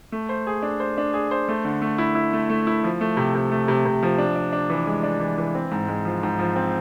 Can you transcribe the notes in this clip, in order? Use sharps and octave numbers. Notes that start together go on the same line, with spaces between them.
A3
C5
G#4
D4
C5
D4
G#4
C5
A3
D3
A3
E4
E4
A3
A3
E4
F3
A3
C3
C3
A3
C3
C3
F3
D4
D4
D4
E3
G#3
D4
E3
E3
C4
G#2
G#3
F3
G#2
F3
C4